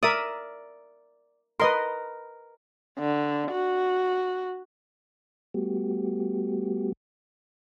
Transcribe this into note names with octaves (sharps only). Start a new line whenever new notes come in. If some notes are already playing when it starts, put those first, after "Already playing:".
A#4 D5 E5 D#6
A#4 B4 D#5 C6
D3
F#4
G3 A3 B3 F#4 G4